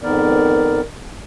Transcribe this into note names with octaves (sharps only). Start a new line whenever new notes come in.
F2 G#2 D#3 B3 A#4 D5